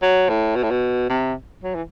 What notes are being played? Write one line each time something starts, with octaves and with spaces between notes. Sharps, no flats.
F#3
A2
B2
A2
B2
C3
F#3
E3